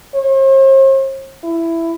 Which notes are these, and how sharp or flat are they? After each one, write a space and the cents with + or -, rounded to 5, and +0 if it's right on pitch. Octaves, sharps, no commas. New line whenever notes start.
C5 +45
E4 +10